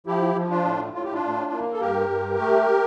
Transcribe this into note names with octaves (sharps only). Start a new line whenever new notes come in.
F3 E4 G4
F3
D4 F4
A2
A2 F4
G4
D4 F4
A2
A#3
A4
G2 G4 A#4
G2
A3